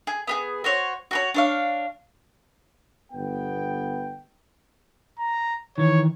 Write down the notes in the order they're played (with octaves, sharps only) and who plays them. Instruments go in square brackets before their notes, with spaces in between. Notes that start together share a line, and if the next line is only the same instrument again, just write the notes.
[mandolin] G#4
B3 G4 G#4
F#4 C5 C#5
F#4 A4 C#5
D4 C#5 F5
[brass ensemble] G1 B3 G5
[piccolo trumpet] A#5
[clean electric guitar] D#3 E3 [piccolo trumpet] C#5